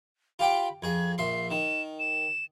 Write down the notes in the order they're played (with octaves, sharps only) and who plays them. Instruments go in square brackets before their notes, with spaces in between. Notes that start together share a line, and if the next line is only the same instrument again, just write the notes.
[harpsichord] F4 G4 G5 [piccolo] B5
[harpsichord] F2 G#4 [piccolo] G#6
[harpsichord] A#1 E5 C6 [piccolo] C7
[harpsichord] D#3 [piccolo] E7
[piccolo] E7